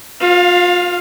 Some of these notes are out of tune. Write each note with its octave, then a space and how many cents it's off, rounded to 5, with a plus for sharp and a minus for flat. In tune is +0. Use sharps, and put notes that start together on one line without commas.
F4 +30 F5 +0